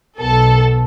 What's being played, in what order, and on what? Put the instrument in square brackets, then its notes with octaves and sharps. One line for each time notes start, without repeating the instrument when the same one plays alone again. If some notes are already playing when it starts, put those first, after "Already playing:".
[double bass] B1 B3 [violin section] A4